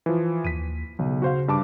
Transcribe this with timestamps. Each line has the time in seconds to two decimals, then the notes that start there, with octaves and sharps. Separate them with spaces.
0.06 E3 F3
0.45 D#2 B6 D#7
0.99 B1 C#3
1.22 F#4 C5 F5
1.48 G2 A5 D6